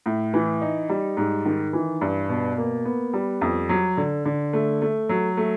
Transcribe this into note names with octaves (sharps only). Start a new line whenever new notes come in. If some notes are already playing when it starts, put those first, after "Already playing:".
A2
E3
D#4
G3
G#2
D#3
E3
G2
B2
A#3
B3
G3
F2
F#3
D3
D3
A3
A3
F#3
A3